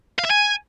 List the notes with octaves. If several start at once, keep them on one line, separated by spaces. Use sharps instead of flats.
F5
E5
G#5